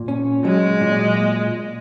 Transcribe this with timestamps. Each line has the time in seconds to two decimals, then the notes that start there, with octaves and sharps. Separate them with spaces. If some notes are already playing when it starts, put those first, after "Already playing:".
Already playing: A#2
0.08 C#4
0.45 F#3 G#3
0.81 A#2